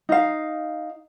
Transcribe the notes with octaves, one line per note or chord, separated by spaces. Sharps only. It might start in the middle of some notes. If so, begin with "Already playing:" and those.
D#4 F5